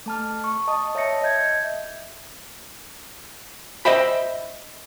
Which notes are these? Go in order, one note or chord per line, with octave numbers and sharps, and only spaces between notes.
A3 A5 F6
C#6
D#5 A5 D#6
C#5 E5 A5 A#6 C#7
D#5 E5 G6 G#6
C5 D#5 E5 G5 B5